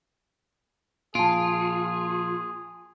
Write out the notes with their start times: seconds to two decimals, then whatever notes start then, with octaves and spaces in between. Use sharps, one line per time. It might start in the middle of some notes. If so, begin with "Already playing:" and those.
1.15 A#2 F3 F4 G#4 A5 D7